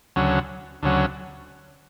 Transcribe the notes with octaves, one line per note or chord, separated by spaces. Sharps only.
D2 C#3 F#3
D2 C#3 F#3